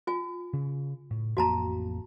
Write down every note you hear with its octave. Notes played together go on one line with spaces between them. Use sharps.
F4 G#5
C#3
A2
A1 F2 A#3 F#4 A5 A#5